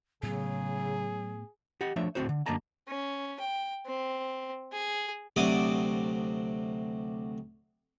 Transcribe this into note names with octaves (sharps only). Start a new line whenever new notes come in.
A2 C#3 F#3 B3 G#4
G4 D#5 F#5
F3 A3 D4 C#5 E5
D2 A2 C4 F#4 C5
D3
F#2 D3 A#3 D#5 A5 A#5
C#4
G5
C4
G#4
D2 C3 F#3 D5 D6 D#6